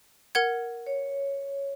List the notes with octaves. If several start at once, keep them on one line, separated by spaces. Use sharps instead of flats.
A#4 F#5 G#6
C#5